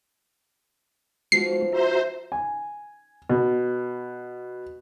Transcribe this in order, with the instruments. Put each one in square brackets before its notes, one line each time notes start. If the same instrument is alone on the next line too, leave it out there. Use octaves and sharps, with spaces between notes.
[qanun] F3 B3 D#4 [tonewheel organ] G#3 F#4 [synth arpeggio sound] C7
[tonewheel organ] F#4 E5 A#5 [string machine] C5
[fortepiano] G#5
B2